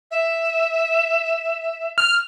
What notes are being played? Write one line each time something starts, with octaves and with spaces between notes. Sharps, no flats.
E5
F6